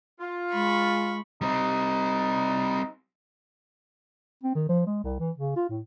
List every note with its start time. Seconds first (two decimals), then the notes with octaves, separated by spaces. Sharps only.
0.20 F4
0.53 G#3 B5 C#6
1.41 G3 C4 D#4
4.43 C4
4.55 D#3
4.69 F3
4.87 G#3
5.03 C2
5.20 E3
5.38 C#3
5.56 F4
5.69 A2